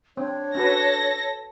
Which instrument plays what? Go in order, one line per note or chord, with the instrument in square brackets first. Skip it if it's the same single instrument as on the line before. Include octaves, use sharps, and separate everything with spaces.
[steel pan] C4 [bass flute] D4 [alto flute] C#5
[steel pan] C#4 F#4 B4 [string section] A4 A#6